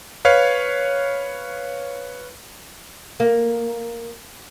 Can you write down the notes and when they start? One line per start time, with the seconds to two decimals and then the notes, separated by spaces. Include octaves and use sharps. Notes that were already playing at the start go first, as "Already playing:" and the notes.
0.25 B4 C#5 F5
3.20 A#3